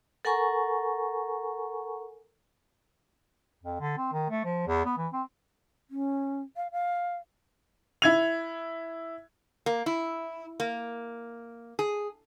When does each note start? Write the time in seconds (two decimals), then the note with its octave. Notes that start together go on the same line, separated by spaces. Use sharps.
0.25 A4 A#4 F#5 G#5 A#5 C#6
3.63 F2
3.80 D3
3.97 C4
4.13 D#3
4.30 A3
4.45 F3
4.68 E2
4.85 B3
4.98 E3
5.13 C4
5.90 C#4
6.56 F5
6.72 F5
8.02 E4 G#6 F7
9.66 A#3
9.86 E4
10.60 A#3
11.79 G#4